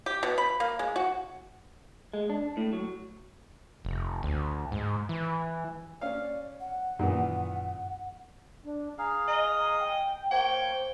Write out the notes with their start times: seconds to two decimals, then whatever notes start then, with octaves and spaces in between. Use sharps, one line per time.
0.06 G4
0.23 B2
0.38 B5
0.60 A#3
0.79 G#3
0.96 F#4
2.14 G#3
2.30 D4
2.57 A2
2.73 F#3
3.85 F1
4.23 D2
4.72 G#2
5.09 E3
6.01 C#4 D5 F5
6.60 F#5
6.99 F#2 A#2 D#3 E3
8.64 D4
8.98 G#4 F5 A#5
9.28 D#5 A#5
9.79 G5
10.31 A#3 C5 C#5 G5 C#6